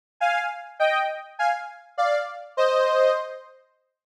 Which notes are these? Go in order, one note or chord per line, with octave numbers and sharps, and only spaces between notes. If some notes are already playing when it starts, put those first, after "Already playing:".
F5 G#5
D#5 G5
F5 G#5
D5 F5
C5 D#5